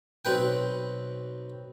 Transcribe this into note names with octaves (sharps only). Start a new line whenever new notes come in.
B1 C4 B4 G5